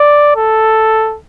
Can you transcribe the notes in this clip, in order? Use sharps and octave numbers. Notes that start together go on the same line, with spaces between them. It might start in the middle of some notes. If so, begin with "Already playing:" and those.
Already playing: D5
A4